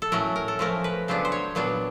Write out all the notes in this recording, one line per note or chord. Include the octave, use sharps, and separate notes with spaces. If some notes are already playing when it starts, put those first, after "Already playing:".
A4
A2 F#3 A3 C#4 A#4
A#4
A4
F3 A3 C#4 A#4
B4
C#3 F#3 B3 D4 C5
C5
C#5
A#2 F#3 B3 D4